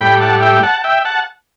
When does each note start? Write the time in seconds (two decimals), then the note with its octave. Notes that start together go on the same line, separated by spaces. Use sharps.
0.01 A2 G3 G5 B5
0.21 F#5 A5
0.42 E5 G5
0.63 F#5 A5
0.84 E5 G5
1.05 F#5 A5